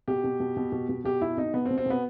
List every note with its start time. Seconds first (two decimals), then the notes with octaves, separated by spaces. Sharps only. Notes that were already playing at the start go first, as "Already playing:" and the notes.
0.08 B2 G4
0.24 B2
0.40 B2
0.57 B2
0.72 B2
0.89 B2
1.04 B2 G4
1.21 B2 E4
1.37 B2 D#4
1.54 B2 B3
1.66 C4
1.70 B2
1.78 C4
1.86 B2 B3